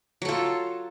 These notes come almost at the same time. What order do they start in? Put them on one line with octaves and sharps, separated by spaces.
F#3 A4 F4